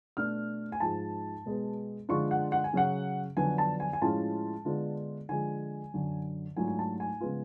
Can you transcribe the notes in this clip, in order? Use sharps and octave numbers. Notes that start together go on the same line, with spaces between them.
B2 A3 D4 F6
G#5
G#2 F3 G#3 A5
B2 G#3 B3
D3 F3 G#3 D4 F4 C#6
F#5
F#5
G#5
C#3 F#3 C#4 F#5
F2 D3 F#3 B3 D4 G#5
A5
G#5
G#5
A2 F3 G#3 C#4 F4 A5
D3 G#3 B3 D4 F4
D3 F3 G#3 G#5
F#2 D3 F#3
G#2 F#3 A3 D4 F4 G#5
G#5
A5
G#5
C#3 F3 G#3 B3 F4